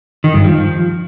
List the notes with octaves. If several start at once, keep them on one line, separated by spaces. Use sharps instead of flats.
D#3
G2
F3